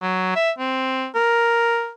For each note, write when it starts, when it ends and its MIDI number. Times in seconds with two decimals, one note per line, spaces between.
0.02 0.35 54
0.35 0.51 76
0.59 1.06 60
1.15 1.90 70